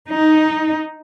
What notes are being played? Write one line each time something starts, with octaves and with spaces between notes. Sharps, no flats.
D#4